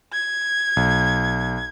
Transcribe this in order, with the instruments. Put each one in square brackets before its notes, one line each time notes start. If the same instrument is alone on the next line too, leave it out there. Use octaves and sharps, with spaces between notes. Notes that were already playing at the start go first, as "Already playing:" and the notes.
[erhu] G#6
[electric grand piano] B1